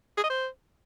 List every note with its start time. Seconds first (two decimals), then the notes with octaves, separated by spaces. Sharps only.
0.17 G#4
0.23 D#5
0.30 C5